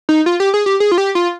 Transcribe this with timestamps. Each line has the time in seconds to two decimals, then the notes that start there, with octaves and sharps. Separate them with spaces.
0.09 D#4
0.26 F4
0.40 G4
0.54 G#4
0.66 G4
0.80 G#4
0.92 F4
0.98 G4
1.15 F4